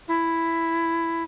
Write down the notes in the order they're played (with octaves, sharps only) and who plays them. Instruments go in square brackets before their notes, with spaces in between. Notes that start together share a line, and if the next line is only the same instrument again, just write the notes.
[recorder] E4